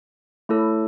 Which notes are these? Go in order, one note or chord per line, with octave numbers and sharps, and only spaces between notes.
A3 E4 A4 C#5